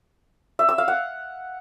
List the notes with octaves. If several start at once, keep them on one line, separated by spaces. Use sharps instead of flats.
E5
E6
F5
F#5